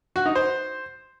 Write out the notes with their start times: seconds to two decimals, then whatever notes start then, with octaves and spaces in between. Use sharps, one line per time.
0.16 F#4
0.26 D#4
0.35 C5